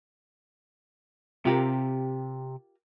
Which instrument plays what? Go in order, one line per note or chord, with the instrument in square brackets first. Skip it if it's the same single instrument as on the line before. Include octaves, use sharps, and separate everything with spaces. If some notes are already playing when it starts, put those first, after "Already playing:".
[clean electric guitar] C3 [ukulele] F4 G4 A#4